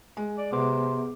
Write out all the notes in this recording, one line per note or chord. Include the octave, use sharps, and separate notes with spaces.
G#3
D5
C3 B3 G#4 C5 D6